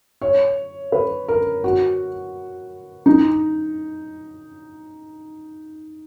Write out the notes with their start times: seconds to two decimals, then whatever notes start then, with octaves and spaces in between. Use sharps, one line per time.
0.22 C#5
0.92 B4
1.28 A#4
1.64 F#4
3.06 D#4